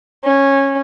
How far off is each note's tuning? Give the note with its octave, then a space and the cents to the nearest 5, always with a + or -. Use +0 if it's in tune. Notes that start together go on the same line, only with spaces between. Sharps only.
C#4 -15